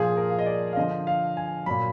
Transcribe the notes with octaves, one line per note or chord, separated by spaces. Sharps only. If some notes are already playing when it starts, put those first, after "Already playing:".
Already playing: A#2 F3 G#4
A#4
F5
D#5
D5
F5
D3 F3 D#5
F5
G#5
A#2 F#3 B5